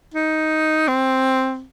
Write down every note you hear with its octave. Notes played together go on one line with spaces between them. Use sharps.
D#4
C4